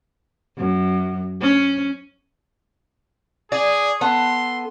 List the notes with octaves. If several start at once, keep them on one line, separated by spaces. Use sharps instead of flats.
F#2
C#4
G#4 D5
B3 A4 C6